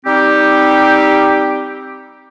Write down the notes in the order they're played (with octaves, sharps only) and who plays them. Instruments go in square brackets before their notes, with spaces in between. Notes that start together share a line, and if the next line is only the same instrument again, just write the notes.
[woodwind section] G3 C4 D#4 G4